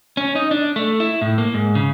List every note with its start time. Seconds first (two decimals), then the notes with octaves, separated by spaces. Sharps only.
0.17 C#4
0.35 D#4
0.51 D4
0.76 A3
1.00 E4
1.21 A2
1.38 A#3
1.54 G#2
1.75 C#3